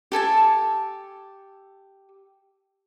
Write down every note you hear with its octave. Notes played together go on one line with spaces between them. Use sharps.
G4 A4 G#5 A5